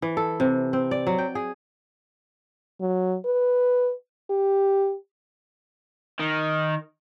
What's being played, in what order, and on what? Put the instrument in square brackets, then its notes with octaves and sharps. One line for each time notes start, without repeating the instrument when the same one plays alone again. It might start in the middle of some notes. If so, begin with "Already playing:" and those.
[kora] E3
A4
C3
C4
D5
F#3
G5
G#4
[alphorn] F#3
B4
G4
[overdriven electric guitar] D#3